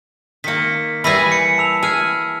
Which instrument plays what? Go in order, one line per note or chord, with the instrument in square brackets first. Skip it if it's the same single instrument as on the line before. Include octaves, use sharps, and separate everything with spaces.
[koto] D#3 A#3 [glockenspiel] B6 C#7
[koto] E3 G3 G#4 [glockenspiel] B5 A#6 B6
[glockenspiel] G#5 C#7
A5 E6 F7
[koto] G#4 [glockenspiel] E6 F6 C#7